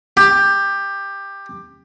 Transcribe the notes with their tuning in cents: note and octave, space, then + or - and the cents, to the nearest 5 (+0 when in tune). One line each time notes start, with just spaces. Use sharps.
G4 +15